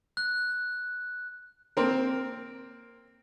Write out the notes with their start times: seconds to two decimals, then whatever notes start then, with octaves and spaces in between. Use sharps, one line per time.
0.17 F#6
1.77 A#3 C4 A#4